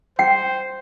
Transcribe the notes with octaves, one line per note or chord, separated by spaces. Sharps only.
C5 G5 C7